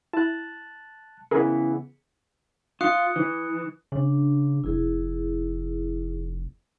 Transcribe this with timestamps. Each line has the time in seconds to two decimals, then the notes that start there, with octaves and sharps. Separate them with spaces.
0.13 E4 A5 F#6
1.31 C#3 E3 B3 G#4 A#4
2.81 F4 D#6 F#6 C#7
3.16 E3
3.92 C#3 D4
4.64 F1 E4 G#4